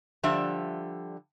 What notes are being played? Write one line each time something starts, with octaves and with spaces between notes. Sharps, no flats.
D3 F3 G3 D4 E5